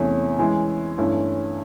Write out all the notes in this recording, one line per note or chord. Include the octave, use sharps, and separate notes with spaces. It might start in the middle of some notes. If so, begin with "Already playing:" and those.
Already playing: E2 C3 E3 A3 C#4
E3 G#3 C#4 E4
G2 E3 A3 C#4 E4